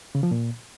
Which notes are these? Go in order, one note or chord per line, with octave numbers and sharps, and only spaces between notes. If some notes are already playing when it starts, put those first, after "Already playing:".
C#3
F3
A#2